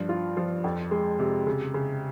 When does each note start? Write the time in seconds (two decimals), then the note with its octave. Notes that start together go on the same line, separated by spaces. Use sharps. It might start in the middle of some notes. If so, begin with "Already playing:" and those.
Already playing: G2 F3
0.09 F4
0.37 F3
0.64 F2
0.91 G#3
1.19 C3
1.47 C#3
1.74 C#3